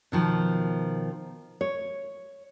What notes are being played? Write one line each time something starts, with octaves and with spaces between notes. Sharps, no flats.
B2 D#3 F3
C#5